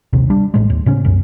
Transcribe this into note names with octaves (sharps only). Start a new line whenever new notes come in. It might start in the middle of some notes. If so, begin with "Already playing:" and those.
A#1 D#2 C3
G3 D4
A1 A2 G#3
D#2
A2 C#3 C#4
C2 F#2